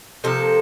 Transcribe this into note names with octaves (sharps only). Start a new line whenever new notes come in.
C3 F3 A#3 A4